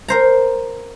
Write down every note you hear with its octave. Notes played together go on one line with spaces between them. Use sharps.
A#4 C5 A#5